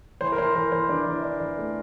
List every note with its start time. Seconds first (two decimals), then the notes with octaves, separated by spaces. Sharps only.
0.21 E3 C5
0.32 A#4
0.38 E3 C5
0.55 E3 A#4
0.72 E3 C5
0.89 E3 D4 D5
1.06 E3
1.23 D4
1.40 E3
1.58 A3